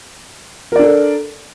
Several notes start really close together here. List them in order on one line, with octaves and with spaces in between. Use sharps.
A#4 D5 D4 A4